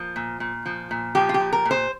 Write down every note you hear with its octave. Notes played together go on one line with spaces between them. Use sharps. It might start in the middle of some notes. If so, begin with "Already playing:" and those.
Already playing: F3 A#3
A#2
A#2
F3
A#2
F3 G4
F4
G4
A#2
A#4
A#2
C5